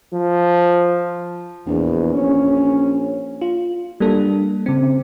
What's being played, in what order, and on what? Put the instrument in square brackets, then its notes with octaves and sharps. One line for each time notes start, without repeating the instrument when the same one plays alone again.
[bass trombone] F3
[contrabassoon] A#1 [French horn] E2
[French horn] C#4
[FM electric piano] F4
G3 A#3 D4 A4
C#3 C4